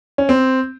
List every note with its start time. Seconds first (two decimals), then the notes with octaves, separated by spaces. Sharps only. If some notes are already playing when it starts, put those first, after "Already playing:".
0.18 C#4
0.29 C4